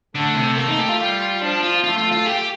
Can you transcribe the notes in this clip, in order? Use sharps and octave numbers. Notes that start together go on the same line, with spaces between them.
D3 A3
C3
A3 A#3
D#4
G4
F4
G3
F3 D4
F4
A3 F4
F4
F4
G4